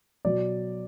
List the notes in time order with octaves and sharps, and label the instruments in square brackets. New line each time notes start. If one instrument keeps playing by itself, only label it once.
[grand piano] B2 F#3 D5